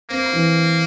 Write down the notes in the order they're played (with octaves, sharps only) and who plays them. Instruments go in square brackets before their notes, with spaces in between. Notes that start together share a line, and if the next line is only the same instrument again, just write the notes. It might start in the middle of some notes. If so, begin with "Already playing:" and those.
[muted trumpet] A#3 [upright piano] C4
[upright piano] E3